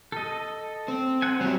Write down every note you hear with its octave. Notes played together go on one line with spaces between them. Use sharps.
A4 D#5
C4
F#5 G#5
F#3 G3 C4 E4